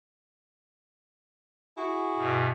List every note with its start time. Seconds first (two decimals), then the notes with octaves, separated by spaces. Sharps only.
1.77 E4 F#4 G#4
2.17 G2 B2